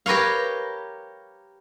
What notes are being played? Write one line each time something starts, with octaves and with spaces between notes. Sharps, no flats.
G4 A#4 B4 C#5 F5